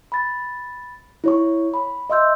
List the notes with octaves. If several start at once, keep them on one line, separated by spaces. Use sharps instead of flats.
B5 A6
E4 C#5 C#6
B5
D#5 E5 C6 E6 G6